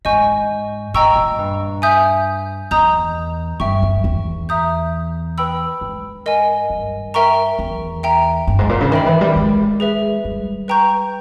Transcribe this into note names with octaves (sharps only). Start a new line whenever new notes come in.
G#2 D#5 G#5 C#6 G6
A#2 D#5 G5 A#5 C#6 E6
A#2
G2
E5 G#5 D#6 G6
E2 D#5 A#5 D#6 G6
G2 E5 G5 C#6
G2
E2
E5 A#5 D#6 G6
B4 G5 B5 E6
G#2
A#4 D#5 G#5
G2
A#4 E5 G5 A#5 C#6
E2
E5 G5 A#5
G2
G#2
A#2
C#3
D#3 A#4 E5 G5 B5
E3
G3
G#3
G#4 B4 E5
G3
B4 G5 A#5 C#6 G6